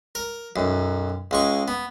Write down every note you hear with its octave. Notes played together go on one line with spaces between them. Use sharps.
A#4
B1 F#2
C#2 G#3 C#6
B3